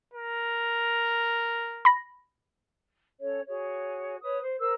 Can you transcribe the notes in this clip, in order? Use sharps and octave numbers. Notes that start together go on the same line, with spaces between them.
A#4
B5 A#6
C#4 A4 C#5
F#4 G#4 C#5
B4 C#5 D#6
C5
A#4 C5 E6